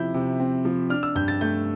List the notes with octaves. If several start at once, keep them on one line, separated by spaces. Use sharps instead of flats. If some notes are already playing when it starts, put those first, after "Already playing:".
Already playing: C3 F3 C4 E4 G6
C3
C4
F3
D4 F6
E6
G2 G6
A6
A3 G6